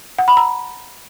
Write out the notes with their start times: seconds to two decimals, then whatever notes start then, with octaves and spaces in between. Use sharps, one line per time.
0.18 F#5
0.28 B5
0.37 A#5